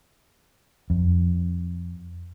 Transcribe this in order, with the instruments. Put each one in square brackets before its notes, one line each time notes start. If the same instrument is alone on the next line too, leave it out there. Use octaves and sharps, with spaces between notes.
[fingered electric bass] F2